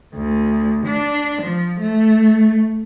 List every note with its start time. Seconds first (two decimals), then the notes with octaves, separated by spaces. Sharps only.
0.14 D2
0.86 D4
1.41 F3
1.80 A3